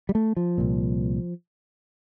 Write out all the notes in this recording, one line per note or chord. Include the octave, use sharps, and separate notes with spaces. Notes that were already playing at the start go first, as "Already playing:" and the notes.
G3
A3
F3
C2 A#2